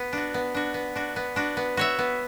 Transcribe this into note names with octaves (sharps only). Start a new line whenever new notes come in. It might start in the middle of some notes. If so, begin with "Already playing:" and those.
Already playing: B3
D4 F#4
B3
D4 F#4
B3
D4 F#4
B3
D4 F#4
B3
F#4 C#5 E5
B3